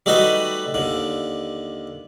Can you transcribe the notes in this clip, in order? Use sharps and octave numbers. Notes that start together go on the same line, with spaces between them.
G3 A3 D#4 F#4 B4 D#5
D#2 D3